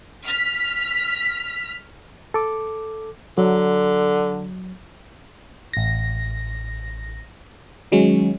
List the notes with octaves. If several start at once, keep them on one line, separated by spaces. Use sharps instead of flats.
F6 B6
A4 D6
D3 F#3
A1 A#6
D#3 F#3 G#3 C#4